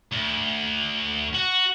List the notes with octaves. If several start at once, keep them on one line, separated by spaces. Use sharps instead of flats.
D2
F#4